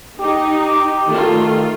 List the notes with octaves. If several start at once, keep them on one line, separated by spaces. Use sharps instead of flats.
D#4 G4
D#3 A3 F4